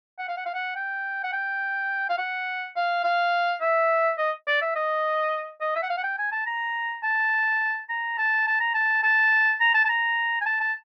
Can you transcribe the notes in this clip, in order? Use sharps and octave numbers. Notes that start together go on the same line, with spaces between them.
F#5
F5
F#5
F5
F#5
G5
F#5
G5
F5
F#5
F5
F5
E5
D#5
D5
E5
D#5
D#5
E5
F#5
F5
F#5
G5
G#5
A5
A#5
A5
A#5
A5
A5
A#5
A5
A5
A#5
A5
A5
A#5
G#5
A5
A5